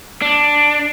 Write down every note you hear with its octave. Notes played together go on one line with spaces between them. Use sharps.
D4